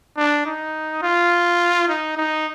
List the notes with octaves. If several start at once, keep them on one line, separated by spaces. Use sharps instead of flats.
D4
D#4
F4
D#4
D#4